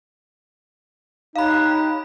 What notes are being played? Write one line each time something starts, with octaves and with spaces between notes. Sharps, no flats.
D#4 G4 C#5 F5 B5 F#6